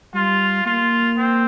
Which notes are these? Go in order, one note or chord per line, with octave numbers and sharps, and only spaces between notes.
G3 F4
A#3 F4
C4